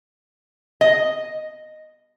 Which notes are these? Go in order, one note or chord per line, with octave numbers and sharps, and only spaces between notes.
D#5